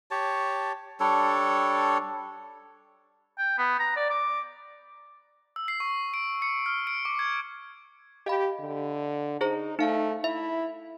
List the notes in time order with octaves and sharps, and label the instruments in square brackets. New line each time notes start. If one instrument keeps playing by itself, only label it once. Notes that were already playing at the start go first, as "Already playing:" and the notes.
[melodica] G4 C#5 A5
G3 D4 A4 C#5
[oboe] G5
B3
A#5
D5
D6
[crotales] E6
C7
C#6
D7
C#7
F6
D7
D6
G#6
[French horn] G4 [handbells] D#5 F5 B5
[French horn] D3
[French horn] D#4 [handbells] G#4 C5 A#5
[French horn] A3 [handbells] D#4 F5
[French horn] E4 [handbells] E5